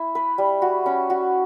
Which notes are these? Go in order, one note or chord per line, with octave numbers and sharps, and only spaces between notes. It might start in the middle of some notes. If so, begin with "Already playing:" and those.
Already playing: E4 E5
B4
G3
F#4
C#4
F#4